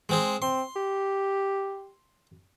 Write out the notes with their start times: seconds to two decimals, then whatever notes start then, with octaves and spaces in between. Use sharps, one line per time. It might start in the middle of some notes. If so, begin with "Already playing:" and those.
0.09 G#3 C4 G#4
0.42 C4 C6
0.76 G4